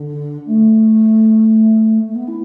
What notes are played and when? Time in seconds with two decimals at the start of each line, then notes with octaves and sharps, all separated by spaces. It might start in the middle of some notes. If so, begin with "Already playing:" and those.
Already playing: D3
0.46 A3
2.08 A3
2.15 B3
2.28 E4